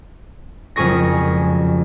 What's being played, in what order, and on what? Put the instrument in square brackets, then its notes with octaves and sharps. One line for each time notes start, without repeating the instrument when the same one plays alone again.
[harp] F#1 F2 G#3 G#4 C#6 A#6